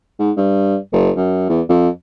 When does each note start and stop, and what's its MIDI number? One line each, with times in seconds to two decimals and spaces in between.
0.19 0.31 44
0.37 0.76 43
0.93 1.10 30
1.16 1.47 42
1.49 1.61 40
1.69 1.89 41